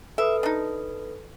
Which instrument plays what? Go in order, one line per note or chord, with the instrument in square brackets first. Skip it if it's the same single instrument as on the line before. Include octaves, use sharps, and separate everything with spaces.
[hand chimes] A4 B4 D#6 [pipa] E5
[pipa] D4 D#4